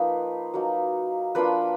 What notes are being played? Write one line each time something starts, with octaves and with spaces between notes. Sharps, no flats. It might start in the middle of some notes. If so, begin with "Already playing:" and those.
Already playing: F3 A#3 D#4 B4
F#3 A#3 D#4
F3 A#3 D4 F4 B4 B5